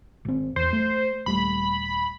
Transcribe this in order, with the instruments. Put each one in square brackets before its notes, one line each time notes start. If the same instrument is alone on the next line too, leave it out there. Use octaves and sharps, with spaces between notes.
[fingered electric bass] G#1 C4
[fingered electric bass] E2 [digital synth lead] C5
[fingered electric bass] A3
[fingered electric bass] D#1 G3 A3 [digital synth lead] B5